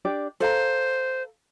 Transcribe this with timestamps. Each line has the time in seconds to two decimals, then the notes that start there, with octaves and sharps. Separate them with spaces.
0.05 D4 G4 D5
0.40 A4 C5 F5 A#5